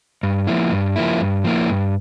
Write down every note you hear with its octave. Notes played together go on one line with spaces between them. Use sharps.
G2
F3 A#3 E4
G2
F3 A#3 E4
G2
F3 A#3 E4
G2